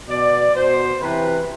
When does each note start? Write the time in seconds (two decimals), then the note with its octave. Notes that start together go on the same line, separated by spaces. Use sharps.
0.08 B2 D5
0.55 B2 C5
1.01 C3 E3 B4